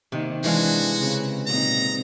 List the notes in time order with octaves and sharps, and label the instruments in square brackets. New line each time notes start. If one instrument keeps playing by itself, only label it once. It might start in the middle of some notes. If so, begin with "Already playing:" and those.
[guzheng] C3 [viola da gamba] D#3 A#3
[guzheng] E3 G#3 F5 [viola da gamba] D4 [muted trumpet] F#4
[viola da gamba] C#3 C4
[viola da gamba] A#2 C4 D#4 [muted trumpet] A#5